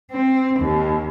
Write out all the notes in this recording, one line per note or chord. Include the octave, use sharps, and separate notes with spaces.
C4
D#2